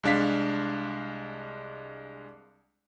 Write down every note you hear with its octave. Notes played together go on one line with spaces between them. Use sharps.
C2 G#3 D4 F5 B6